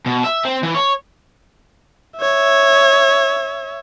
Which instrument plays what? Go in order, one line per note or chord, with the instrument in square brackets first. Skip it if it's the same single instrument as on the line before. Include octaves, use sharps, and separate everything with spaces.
[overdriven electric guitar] B2
E5
C4
E3
C#5
[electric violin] C#5 E5